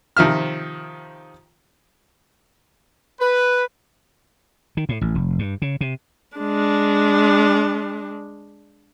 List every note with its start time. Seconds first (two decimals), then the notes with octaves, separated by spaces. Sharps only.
0.17 C3 D#3 F3 E5 F6
3.21 B4
4.77 D#3
4.89 A2
5.01 A1
5.15 F1
5.39 G2
5.62 C#3
5.81 C3
6.37 G#3 D4